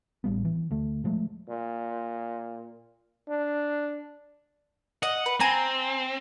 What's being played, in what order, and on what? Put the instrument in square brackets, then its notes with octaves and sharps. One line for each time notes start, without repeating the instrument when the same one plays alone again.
[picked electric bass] A1 G3 B3
E3
D2 A3
B2 F3 G#3 A3
[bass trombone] A#2
D4
[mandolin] D#5 [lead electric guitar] F#5
[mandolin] B4
[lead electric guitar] C4 [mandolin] G#5 A#5